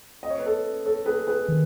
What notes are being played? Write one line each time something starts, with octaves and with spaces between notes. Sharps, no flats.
D#5
C#5
B4
A4 C#5
A4 C#5
G#4 B4
G#4 B4
D#3